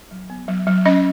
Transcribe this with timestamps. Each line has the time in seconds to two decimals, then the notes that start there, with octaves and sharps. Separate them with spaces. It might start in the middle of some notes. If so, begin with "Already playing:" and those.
0.11 F#3
0.30 B3
0.48 F#3
0.67 F#3
0.85 C#4 D#5